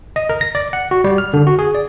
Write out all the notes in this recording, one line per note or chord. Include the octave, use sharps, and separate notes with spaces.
D#5
A#4
A#6
D5
F#5
F#4
G3
F6
D3
F#4
G#4
D5